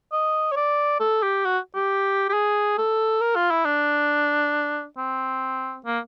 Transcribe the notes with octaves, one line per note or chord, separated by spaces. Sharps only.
D#5
C#5
D5
A4
G4
F#4
G4
G4
G#4
A4
A#4
F4
E4
D4
C4
A#3